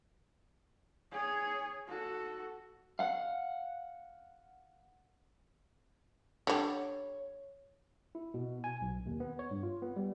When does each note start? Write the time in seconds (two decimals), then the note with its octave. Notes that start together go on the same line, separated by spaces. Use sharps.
1.11 G#4 C#5
1.87 F#4 A4
2.99 F5 F#5
6.47 D3 G3 C#5
8.15 E4
8.34 B2
8.64 G#5
8.81 B1
9.06 D#2
9.20 B3
9.39 C#5
9.51 G2
9.63 F4
9.82 B3
9.96 G3